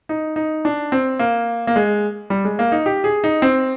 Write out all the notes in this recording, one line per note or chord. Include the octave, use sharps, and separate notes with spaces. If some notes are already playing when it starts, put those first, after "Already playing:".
D#4
D#4
D4
C4
A#3
A#3
G#3
G3
G#3
A#3
D#4
G4
G#4
D#4
C4